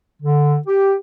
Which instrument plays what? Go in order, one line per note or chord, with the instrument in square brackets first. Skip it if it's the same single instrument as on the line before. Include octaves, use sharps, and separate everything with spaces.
[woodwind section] D3
G4